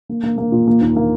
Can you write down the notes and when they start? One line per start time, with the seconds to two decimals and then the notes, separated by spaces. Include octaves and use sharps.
0.09 A#3
0.23 A#3
0.38 A#3
0.52 A#2
0.68 A#3
0.81 D#2
0.96 A#3